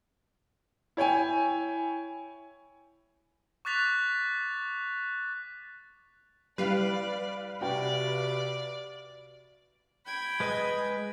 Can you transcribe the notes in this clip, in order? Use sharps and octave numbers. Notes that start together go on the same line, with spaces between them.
E4 C#5 G5 G#5
C#6 D6 F#6 A6 B6 F7
G3 E4 B4 D5 F5
C3 F#4 D5 G5
G5 B5 G#6
G#3 B4 D#5